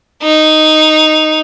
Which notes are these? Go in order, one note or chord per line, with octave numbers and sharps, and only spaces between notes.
D#4